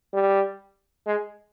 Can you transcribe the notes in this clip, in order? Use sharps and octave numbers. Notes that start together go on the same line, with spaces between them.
G3
G#3